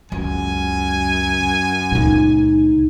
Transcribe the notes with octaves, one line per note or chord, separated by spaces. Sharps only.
C#2 F#2 G#5
C#2 A#2 D#4